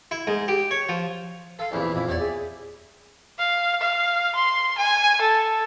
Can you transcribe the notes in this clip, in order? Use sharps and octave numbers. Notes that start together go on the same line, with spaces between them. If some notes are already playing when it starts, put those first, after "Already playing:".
E4
G#2
G4
C#5
F3
A4 F5
A#1 E2 C3 E4
F2 A#2 E4
E2 G4 C#5 D5
G#4 E5
F5
F5
C6
G#5
A4